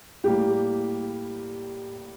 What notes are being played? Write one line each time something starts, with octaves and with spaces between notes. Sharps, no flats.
A2 G3 A#3 G4